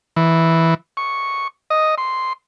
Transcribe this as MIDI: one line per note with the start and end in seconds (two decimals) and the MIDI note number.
0.16 0.74 52
0.97 1.48 85
1.70 1.95 75
1.98 2.33 84